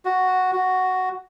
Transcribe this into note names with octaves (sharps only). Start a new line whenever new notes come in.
F#4
F#4